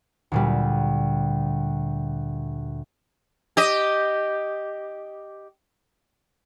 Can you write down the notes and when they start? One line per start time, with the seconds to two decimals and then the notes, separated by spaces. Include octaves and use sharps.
0.32 D2 A#2 G3
3.57 G4 D#5